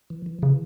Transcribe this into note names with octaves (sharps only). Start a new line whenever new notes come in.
E3
E3
C#3 E3